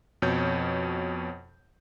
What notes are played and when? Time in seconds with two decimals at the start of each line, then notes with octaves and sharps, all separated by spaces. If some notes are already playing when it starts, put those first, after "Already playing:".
0.22 F2 B2 C#5 G6